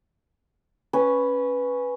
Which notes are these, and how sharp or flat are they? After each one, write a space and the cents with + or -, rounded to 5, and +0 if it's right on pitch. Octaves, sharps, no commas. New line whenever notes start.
C#4 +0 B4 +0